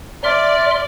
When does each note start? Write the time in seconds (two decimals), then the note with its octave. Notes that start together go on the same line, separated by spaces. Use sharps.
0.24 D5 E5 C6 F6